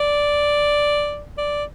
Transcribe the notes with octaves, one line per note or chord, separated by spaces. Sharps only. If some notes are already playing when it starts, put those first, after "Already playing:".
Already playing: D5
D5